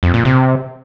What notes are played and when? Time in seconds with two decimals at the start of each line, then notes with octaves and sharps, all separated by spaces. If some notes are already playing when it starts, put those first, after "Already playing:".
0.03 F2
0.14 A#2
0.25 C3